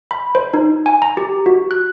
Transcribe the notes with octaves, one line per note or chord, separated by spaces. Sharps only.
B5
C5
D#4
G#5
A#5
G4
F#4
F#6